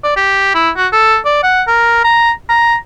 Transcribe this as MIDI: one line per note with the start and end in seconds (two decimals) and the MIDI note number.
0.04 0.11 74
0.16 0.51 67
0.54 0.70 64
0.77 0.87 66
0.92 1.17 69
1.25 1.38 74
1.43 1.62 78
1.67 2.00 70
2.04 2.31 82
2.49 2.75 82